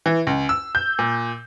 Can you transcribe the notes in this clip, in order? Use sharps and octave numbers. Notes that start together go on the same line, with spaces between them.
E3
C#2
E6
G6
A#2